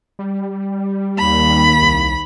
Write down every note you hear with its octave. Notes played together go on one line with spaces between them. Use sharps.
G3
D#2 B5
C2